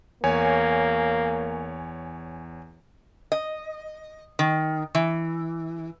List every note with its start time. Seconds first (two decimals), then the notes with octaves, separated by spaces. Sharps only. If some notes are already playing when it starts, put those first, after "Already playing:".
0.24 E2 A#3 C#5 G#5
3.32 D#5
4.39 D#3
4.95 E3